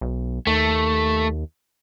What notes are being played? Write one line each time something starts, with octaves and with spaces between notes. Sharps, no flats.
B1
D#2 A3